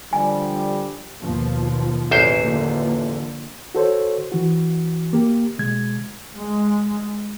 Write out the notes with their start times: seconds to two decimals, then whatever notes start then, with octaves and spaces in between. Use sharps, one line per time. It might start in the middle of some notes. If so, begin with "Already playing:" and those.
0.13 D3 F3 G3 G#5
1.22 D#2 B2 F3
2.11 A1 E2 C5
2.43 D3 F3 A#3
3.75 F#4 A4 C5 C#5
4.32 E3 F#4
5.13 A#3 G4
5.59 B2 G#3 G#6
6.35 G#3